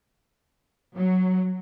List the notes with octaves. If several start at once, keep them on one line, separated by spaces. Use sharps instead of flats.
F#3